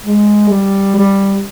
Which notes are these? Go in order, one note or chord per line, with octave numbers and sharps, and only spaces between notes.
G#3
G3
G3